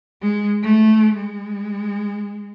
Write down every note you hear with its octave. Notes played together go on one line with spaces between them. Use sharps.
G#3
A3
G#3